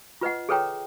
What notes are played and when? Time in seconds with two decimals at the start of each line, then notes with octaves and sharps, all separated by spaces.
0.21 F4 B4 D#5 F#5
0.49 G#4 A4 B4 C#5 G5 A#5